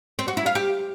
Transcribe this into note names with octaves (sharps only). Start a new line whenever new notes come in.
C4
F#4
E4
F5
G4